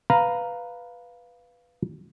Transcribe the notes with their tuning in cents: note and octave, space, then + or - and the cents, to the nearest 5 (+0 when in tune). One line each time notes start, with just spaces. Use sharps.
B4 +0 F5 +0 A#5 +0